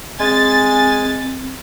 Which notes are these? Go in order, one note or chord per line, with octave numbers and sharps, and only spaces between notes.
G#3 C4 G#5 A6